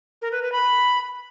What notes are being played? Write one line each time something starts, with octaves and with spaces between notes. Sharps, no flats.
A#4
B4
B4
B5